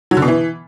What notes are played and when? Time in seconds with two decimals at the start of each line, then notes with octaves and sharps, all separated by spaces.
0.11 F#3
0.17 D3
0.22 B2
0.28 E3